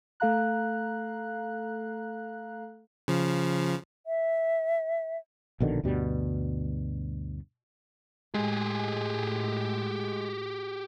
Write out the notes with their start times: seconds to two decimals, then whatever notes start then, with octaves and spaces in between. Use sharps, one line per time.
0.20 A3 A4 F5 A#5 F#6
3.08 C#3 F3
4.07 E5
5.60 A#1 B2 D3 D#3
5.84 D2 G2 B2 G3
8.34 A2 G#3 G4 G#4